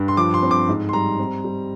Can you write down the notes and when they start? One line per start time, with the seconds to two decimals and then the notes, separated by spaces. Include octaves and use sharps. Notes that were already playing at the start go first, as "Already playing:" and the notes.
Already playing: G2
0.08 C6
0.17 F3 D6
0.34 C6
0.43 C4
0.51 D6
0.69 G#2
0.89 C6
0.93 G3 A#5
1.19 C4
1.44 G3